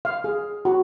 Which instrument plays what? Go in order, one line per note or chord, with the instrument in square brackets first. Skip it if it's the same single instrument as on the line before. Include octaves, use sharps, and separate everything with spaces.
[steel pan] F5
G#4
F#4